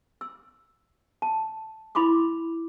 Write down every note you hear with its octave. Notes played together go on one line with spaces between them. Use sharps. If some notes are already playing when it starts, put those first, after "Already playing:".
E6
A5
E4 B5 C6 D6 D#6